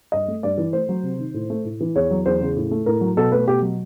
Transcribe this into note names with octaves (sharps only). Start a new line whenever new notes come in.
G2 D#5
A3
G2 D5
E3
A3 C5
F#3
C3
D#3
A2
A3
A2
E3
E2 C#5
F#3
E2 C5
C#3
A2
A3
A2 A#4
F#3
B2 A4
A3 B4
B2 G4
F#3